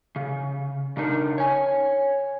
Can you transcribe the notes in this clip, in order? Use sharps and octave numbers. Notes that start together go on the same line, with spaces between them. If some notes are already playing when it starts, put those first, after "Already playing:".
C#3
C#3 D4 D#4 A#4
C#5 G#5